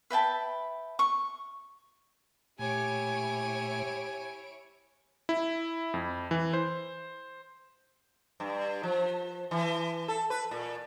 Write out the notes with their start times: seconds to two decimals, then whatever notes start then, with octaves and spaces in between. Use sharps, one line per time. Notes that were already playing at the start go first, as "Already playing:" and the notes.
0.10 B4 E5 G5 A5
0.99 C#6
2.59 A#2 A3 E4 G4 C#5 G#5 D7
5.29 E4
5.94 F2
6.31 E3
6.53 C5
8.40 G2
8.83 F3
9.51 E3
10.08 A4
10.30 B4
10.51 A#2